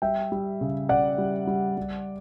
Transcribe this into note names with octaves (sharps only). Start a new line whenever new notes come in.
G3 E5 G5
G3
C#3
C#3 D5 F#5
G3
G3
G3